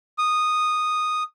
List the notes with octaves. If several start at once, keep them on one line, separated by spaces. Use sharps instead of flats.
D#6